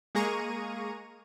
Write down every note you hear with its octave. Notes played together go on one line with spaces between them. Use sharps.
G#3 A#3 G#4 A#5 C#6 D#7